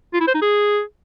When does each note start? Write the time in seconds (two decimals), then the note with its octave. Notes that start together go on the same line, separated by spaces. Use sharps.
0.13 F4
0.20 E4
0.27 C5
0.34 D#4
0.41 G#4